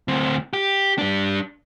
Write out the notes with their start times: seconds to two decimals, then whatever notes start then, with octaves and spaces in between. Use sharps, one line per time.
0.08 D2 C4
0.53 G4
0.98 G3 D4